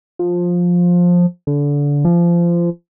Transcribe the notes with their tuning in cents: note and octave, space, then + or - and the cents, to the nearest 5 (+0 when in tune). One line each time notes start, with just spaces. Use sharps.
F3 +15
D3 -25
F3 -25